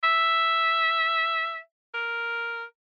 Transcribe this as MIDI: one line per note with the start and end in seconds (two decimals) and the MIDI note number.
0.04 1.59 76
1.94 2.65 70